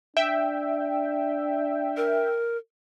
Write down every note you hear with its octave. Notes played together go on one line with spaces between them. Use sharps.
D4 E5 G5
A#4